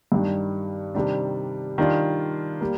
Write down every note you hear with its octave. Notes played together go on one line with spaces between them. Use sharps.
G2 D#3 G3 D4
C3 D#3 G3 D4
D#3 G3 D4 F4
G3 A#3